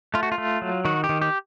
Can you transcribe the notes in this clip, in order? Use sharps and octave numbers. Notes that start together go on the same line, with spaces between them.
A3 F4
F#4
F4
A3
F#3
D#3 F#4
G4
D#3
G4